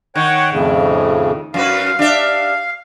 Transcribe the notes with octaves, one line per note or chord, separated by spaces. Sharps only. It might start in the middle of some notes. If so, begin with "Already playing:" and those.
D#3 C#5 F#5 G5
F2 A2 C#3
F#2 F#4 B4 F5
D4 G4 E5